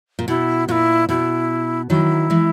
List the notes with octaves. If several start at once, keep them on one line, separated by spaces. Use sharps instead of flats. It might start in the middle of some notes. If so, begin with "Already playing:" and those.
A#2
B2 E4
A#2 E4 F#4
B2 E4
D#3 F#3 E4
E3 G#3